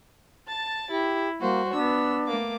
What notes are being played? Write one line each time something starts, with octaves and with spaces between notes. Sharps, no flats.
A5 A6
E4 G4
G3 A#3 F#4 C5
B3 D4 E6
A3 A#3 D6